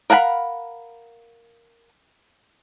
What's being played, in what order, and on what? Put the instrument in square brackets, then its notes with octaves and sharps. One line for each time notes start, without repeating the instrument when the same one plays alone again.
[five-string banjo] A#4 F5 F#5 G#5 B5